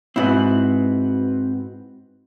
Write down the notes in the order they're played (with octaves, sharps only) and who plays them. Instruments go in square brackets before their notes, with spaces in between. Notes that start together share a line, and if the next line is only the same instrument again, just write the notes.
[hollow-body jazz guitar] G#2 E4 [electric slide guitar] C4 F#4 B4